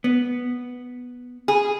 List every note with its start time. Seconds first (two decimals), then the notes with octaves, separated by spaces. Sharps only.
0.04 B3
1.48 G#4